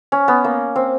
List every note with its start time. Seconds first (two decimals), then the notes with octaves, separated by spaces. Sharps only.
0.12 C#4
0.28 B3
0.44 A#3
0.76 C4